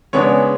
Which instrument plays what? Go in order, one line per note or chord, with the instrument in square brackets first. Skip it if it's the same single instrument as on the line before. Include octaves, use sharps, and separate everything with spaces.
[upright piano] C#3 G#3 B3 D4 C#5